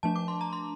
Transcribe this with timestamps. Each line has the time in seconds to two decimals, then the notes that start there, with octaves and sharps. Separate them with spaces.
0.03 F3 A3 D4 A5
0.16 D6
0.28 C6
0.41 A#5
0.53 C6